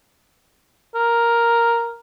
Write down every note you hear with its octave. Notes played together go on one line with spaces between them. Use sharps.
A#4